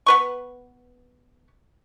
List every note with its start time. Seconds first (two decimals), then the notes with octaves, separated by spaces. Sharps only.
0.06 B3 B4 C#6